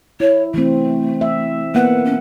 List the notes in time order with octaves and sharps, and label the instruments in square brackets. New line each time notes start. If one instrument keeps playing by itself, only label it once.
[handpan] E4 [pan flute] C#5
[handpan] E3 C4 [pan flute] A3
[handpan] E5
[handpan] A#3 B3 F#5 [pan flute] B4
[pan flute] C#4